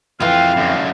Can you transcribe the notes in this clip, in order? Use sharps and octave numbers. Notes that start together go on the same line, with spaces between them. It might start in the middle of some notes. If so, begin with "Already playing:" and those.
F2 E3 F4 B4 F5
F#2 D3